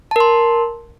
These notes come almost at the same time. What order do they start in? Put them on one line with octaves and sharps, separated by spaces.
A5 A#4 C6